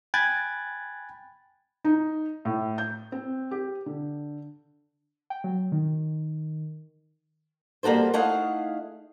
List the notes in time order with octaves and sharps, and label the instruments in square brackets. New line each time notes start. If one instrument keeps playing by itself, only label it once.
[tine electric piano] G5 G#5 B5 F#6 G#6 A6
[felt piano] D#4
A2
G6
C4
G4
D3
[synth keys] G5
F#3
D#3
[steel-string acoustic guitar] G3 A#3 F#4 A4 C5
A3 D#4 E4 G#4 F5 F#5